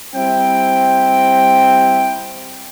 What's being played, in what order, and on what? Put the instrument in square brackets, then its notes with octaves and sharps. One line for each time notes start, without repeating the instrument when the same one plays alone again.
[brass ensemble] G3 C4 E4 G5